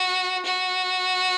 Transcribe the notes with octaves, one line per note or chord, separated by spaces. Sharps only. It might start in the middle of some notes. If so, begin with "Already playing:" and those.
Already playing: F#4
F#4